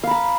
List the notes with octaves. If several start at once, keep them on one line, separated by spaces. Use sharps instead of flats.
F5 A#5 B5